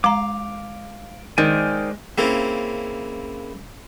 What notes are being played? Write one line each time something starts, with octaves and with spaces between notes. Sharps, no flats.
G#3 F5 A#5 D6
D#3 G#3 C5 D5 G#5
C#3 A#3 C4 C#4 E4